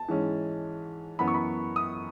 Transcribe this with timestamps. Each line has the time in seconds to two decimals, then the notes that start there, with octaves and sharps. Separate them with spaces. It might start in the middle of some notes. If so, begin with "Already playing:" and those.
Already playing: A5
0.08 G#2 E3 G#3 C#4
1.19 F#2 E3 B3 B5
1.28 C#6
1.34 B5
1.76 D#6